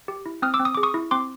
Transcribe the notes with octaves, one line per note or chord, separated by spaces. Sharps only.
G4
E4
C4 D#6 F6
D6 E6
C4
D#6
G#4 D6
C#6 D#6
E4
C4 C6 D6